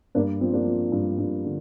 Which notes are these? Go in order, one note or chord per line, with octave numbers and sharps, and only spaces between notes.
G2 A#3 D4
F3 C4
A#3 D4
F3
G2
G2
D3